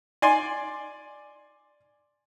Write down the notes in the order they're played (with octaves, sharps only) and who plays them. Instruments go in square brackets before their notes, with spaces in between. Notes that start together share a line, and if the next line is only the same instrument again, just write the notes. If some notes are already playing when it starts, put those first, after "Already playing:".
[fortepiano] D5 G#5 C6